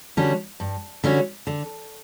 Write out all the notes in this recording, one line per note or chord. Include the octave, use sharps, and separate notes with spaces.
D3 G3 C#4 F#4
G2
D3 G3 C#4 F#4
D3